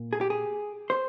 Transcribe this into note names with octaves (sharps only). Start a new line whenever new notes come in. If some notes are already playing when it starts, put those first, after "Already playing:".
Already playing: A#2
G#4
G4
G#4
C5